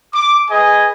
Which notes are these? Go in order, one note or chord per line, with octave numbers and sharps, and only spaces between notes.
D6
G#4 B4 D#5 G#5